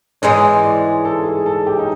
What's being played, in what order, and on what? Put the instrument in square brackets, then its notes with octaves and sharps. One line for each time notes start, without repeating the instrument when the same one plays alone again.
[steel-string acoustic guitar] G#2 E3 G#3 [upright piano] C#5
[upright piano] D5
A4
G#4
A4
G4
D#4